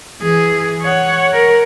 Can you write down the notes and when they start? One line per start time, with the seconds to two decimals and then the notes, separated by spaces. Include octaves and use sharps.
0.22 E3 G#4
0.82 C#5 F#5
1.33 A#4